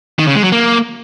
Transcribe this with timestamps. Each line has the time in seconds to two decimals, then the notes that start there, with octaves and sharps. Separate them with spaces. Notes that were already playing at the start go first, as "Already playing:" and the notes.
0.19 D#3
0.27 C#3
0.36 G#3
0.44 F#3
0.52 A#3